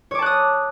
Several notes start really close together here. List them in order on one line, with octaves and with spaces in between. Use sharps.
C#5 D6 A5 F#6 D#6